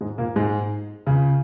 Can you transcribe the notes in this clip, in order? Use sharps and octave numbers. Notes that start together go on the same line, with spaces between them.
G#2 G#3
A#2 A#3
G#2 G#3
C#2 C#3